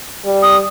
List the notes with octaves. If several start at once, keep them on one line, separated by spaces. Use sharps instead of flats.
G3
D#6